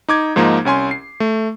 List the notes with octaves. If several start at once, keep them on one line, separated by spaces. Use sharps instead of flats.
D#4 D6 G#6
G#2 F3 A#3 D#4
C2 C#4 G#5 C6
C7
A3